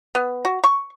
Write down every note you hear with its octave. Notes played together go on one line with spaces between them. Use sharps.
B3
F#4
C#6